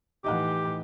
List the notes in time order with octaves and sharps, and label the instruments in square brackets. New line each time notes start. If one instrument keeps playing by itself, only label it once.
[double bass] A2 E3 [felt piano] D#4 D#5 F#5 [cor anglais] G4